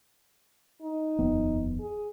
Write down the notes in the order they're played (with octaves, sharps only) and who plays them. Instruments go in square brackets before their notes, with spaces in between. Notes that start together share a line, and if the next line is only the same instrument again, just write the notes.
[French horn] D#4
[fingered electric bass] D#1 F2 B3
[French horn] G#4